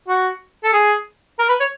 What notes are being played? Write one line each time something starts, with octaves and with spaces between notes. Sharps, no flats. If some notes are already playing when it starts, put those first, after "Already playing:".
F#4
A4
G#4
A#4
B4
C#5